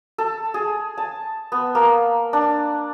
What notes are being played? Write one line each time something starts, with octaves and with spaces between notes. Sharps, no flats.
A4
G#4
A5
B3
A#3
D4